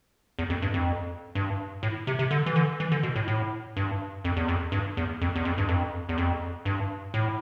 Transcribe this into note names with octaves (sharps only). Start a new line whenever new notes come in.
E2
F2
G2
F2
G2
A2
C3
C3
D3
E3
D3
E3
D3
B2
A2
A2
G2
F2
E2
F2
G2
E2
F2
E2
F2
G2
F2
E2
F2
G2
A2